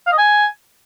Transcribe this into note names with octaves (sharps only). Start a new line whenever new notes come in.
F5
D#5
G#5